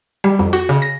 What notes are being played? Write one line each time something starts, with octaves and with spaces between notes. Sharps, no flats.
G3
F2
F#4
C#3
A#6